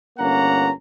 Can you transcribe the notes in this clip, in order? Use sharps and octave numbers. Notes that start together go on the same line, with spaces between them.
G1 A#3 C#4 F#5 A#5